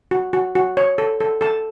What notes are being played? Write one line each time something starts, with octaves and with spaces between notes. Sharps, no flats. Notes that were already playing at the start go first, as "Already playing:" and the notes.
F#4
F#4
F#4
C#5
A4
A4
A4 A5